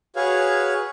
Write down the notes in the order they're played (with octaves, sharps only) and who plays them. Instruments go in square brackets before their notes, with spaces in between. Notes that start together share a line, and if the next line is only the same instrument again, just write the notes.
[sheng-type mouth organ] F#4 G#4 B4 C#5 F5